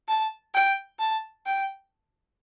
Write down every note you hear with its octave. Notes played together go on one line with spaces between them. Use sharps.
A5
G5
A5
G5